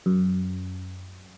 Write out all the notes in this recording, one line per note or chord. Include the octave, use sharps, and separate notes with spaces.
F#2